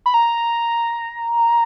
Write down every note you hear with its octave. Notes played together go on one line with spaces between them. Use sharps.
B5
A#5